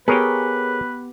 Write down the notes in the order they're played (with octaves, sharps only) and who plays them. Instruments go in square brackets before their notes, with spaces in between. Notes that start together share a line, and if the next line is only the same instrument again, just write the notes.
[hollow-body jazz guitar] B3 G4 [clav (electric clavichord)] G#4 A#4 C#5 [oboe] B4